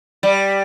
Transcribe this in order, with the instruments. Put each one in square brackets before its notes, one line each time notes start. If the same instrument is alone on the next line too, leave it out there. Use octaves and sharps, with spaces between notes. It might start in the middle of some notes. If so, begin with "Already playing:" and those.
[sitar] G3